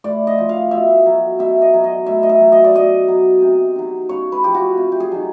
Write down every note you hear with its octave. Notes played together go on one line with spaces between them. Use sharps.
A2 D5
D#5
F3
F5
B2 E5
F#3
B2 E5
D#5
F#3
D#5
A2 E5
D#5
E5
F#3
D#5
D5
B2 D#5
F#3
C3
D#3 F#3
C#3 C#5
B4
F3 G4
F#4
C3
G4
G#4
D#3 F#3